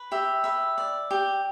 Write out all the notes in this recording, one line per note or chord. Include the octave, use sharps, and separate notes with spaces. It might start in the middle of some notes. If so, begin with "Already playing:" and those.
Already playing: B4
G4 E5
B4 E5
D5
G4